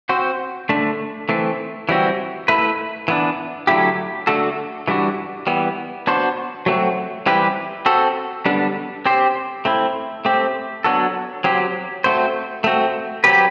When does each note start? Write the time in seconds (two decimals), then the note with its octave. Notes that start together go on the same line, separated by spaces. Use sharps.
0.09 C4 F#4 C5
0.69 D3 A3 D4
1.29 E3 A3 C4
1.89 E3 G3 C4 F#4
2.48 A3 E4 B4
3.08 E3 B3 D4
3.67 D3 F#3 A3 E4 G4
4.27 D3 A3 D4 F#4 A4
4.88 E3 G3 D4 F#4
5.47 E3 G3 B3
6.07 B3 D4 F#4 C5
6.66 F#3 A3 C4 F#4
7.26 E3 G3 C4 G4 B4
7.86 C4 F#4 A4
8.46 D3 G3 B3 D4
9.06 C4 G4 C5
9.65 A3 C4 E4
10.25 A3 C4 G4
10.84 F#3 B3 D4 F#4 A4
11.44 F#3 C4 G4
12.04 A3 C4 F#4 C5
12.64 A3 C4 F#4
13.24 F#3 C4 G4 B4